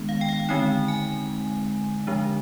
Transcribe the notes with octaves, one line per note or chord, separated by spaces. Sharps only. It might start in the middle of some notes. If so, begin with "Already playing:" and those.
Already playing: D#3 G#3 B3 D4
F5
G5
F5
D3 G#3 C4 D#4 G5
G#5
D3 F3 G#3 D4